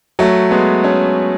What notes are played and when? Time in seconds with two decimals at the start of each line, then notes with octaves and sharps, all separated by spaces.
0.19 F#3 A3
0.51 G#3 B3
0.84 A3 C#4